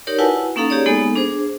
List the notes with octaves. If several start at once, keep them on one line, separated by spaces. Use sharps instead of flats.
D#4 G4 A#4 C#5 D5
E4 F#4 B4 F#5 G#5 A5
A#3 C#4 D#4 A4 F5 A#5
G4 G#4 C#5 D5
G#3 A#3 B3 D#4 A4 G#5
D4 G#4 C5